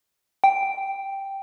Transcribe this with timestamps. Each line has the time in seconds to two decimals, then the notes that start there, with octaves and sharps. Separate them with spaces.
0.44 G5